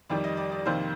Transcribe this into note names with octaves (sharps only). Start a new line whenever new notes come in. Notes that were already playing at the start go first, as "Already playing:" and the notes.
F2 D#3 G3 D5
D#5
D5
D5
F2 C3 D#3 A#3 C5